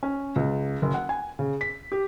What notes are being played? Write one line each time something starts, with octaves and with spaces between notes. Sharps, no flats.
C#4
C#2
F#1
F#5
G#5
C#3
B6
G4